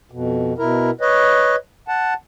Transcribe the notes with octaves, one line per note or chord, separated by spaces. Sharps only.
F2 B2
B2 E4 A#4
B4 C#5 D#5
F#5 A5